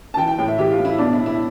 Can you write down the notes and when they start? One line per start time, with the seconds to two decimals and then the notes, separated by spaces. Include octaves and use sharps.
0.14 A5
0.17 E3 G5
0.27 G5
0.38 A2 G5
0.48 E5
0.58 E3 G4
0.71 F4
0.78 A2
0.85 E4
0.98 B2 D4
1.13 E4
1.18 B2
1.26 E4